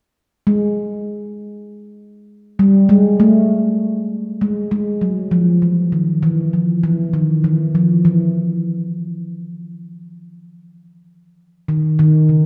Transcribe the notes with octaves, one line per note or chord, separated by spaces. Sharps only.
G#3
G3
G#3
A3
G#3
G#3
F#3
F3
E3
D#3
E3
F3
E3
D#3
E3
F3
E3
D#3
D#3
C#3